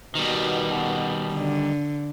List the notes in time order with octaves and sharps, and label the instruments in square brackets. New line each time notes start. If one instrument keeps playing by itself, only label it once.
[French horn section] B2 [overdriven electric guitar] D#3 G3
[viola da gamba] D3